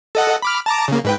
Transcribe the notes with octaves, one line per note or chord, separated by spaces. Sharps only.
A4 D#5 F#5
B5 D6 F6
A5 A#5 D6
C#3 A#3
G#2 B4 G5